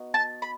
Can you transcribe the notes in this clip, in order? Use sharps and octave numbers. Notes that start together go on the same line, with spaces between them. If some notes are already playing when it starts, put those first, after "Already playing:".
Already playing: B3 D#4 F#4
A5
B5